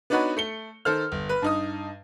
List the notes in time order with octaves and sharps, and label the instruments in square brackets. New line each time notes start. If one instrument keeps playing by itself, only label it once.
[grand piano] B3 D4 D#4 F#4 B4 C#5
A3 C#7 G7
D#3 A4 C5 F6
G1
B4
G2 D#4 D#6